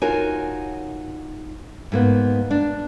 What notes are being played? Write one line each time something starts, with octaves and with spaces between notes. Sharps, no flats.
D#4 F4 F#4 A#4 C#5 G#5
G#2 A#3 B3
D4